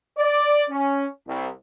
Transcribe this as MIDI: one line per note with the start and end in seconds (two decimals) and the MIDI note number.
0.18 0.63 74
0.70 1.05 61
1.27 1.47 36